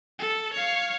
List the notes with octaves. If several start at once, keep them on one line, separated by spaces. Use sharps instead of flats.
A4
C#5 F5